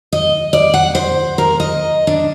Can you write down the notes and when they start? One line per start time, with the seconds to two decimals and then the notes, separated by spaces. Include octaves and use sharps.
0.13 D#5
0.53 D5
0.74 F#5
0.95 C5
1.38 A#4
1.60 D#5
2.07 D4